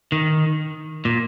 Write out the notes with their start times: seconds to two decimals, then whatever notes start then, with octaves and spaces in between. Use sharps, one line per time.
0.12 D#3
1.05 A#2